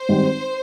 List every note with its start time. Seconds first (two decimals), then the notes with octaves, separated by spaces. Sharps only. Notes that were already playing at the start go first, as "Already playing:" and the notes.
Already playing: C5
0.09 G#1 G2 D#3 G3 C4